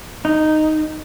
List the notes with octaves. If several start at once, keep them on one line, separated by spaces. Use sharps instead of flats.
D#4